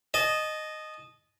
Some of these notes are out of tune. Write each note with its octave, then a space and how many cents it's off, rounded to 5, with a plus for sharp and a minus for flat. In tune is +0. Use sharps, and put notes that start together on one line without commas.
D#5 -10 A5 -30